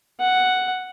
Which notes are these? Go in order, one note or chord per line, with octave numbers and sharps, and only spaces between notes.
F#5